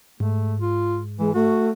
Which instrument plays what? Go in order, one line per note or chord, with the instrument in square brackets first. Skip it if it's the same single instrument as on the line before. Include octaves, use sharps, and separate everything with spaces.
[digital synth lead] G#2 [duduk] A3
[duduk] F4
[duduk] E3 [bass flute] G#3
[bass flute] A3 [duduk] F#4